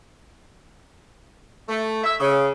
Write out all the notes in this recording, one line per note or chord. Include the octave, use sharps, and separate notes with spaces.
A3
E5
C#3